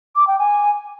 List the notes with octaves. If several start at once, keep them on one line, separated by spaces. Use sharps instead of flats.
D6
G5
G#5